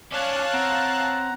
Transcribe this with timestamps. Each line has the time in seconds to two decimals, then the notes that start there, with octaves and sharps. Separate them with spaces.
0.12 C#4 C#5 D5 F5 A5 F#6
0.54 C4 F#5 A#5